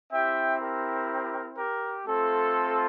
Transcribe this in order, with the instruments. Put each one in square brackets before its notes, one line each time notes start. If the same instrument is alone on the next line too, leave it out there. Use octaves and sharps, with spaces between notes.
[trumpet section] C4 E4 G4 E5 G5
G4 A#4
G4 A#4
A3 C4 F4 A4